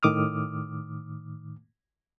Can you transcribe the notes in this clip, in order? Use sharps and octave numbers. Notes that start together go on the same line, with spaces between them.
A2 D#3 D6 D#6 F6